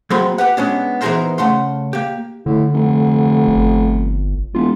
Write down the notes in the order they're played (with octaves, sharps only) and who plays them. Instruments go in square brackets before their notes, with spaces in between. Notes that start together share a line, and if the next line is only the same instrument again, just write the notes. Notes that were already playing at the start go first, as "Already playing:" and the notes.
[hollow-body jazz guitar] F#3 A#3 C4 G#4 B5 C6
G4 B4 F#5
G#3 B3 C#4 D4
E3 B3 D#4 G#4 A#4 C5
C#3 A3 F#5 C6
A#3 G4
[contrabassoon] A2 [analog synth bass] D3
[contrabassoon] F1
[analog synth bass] G1
[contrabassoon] E1 [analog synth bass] F4